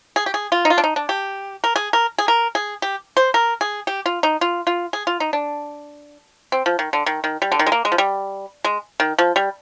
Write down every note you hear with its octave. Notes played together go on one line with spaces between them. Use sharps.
G#4
G4
G#4
F4
D#4
F4
D4
D#4
D4
G4
A#4
G#4
A#4
G#4
A#4
G#4
G4
C5
A#4
G#4
G4
F4
D#4
F4
F4
G#4
F4
D#4
D4
C4
F3
D#3
D3
D#3
D#3
G3
D3
D#3
G#3
A#3
G#3
F3
G3
G#3
D#3
F3
G3